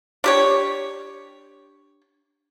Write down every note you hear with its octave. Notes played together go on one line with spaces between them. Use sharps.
D4 G4 C#5